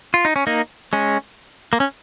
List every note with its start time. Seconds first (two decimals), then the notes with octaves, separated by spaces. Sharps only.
0.14 F4
0.25 D#4
0.36 C#4
0.47 A#3 D#4
0.93 G#3 C#4
1.73 A#3
1.80 C#4